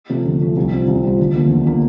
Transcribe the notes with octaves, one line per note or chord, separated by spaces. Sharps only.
C3 F3 A3
D2
C3 F3 A3
C2
C3 G3 C4 F4
C2
C3 G3 C4 F4
D2
D3 F3 A#3
D2
D3 F3 A#3